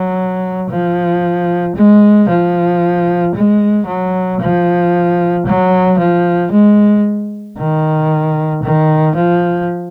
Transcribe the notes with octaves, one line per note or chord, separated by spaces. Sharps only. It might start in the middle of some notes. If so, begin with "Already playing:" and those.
Already playing: F#3
F3
G#3
F3
G#3
F#3
F3
F#3
F3
G#3
D#3
D#3
F3